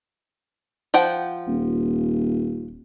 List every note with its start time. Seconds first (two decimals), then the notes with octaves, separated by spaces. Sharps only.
0.94 F3 F#5 G5
1.48 D#1